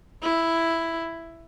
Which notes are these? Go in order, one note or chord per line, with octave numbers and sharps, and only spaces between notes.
E4